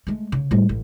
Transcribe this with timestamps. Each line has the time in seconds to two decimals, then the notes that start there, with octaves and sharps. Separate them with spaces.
0.07 G#3 A3
0.32 C#3
0.51 A2 G3
0.69 A1